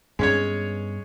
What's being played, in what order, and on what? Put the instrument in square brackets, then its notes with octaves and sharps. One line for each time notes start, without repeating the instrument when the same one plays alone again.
[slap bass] G2 B3 [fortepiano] G#3 C#4 C#5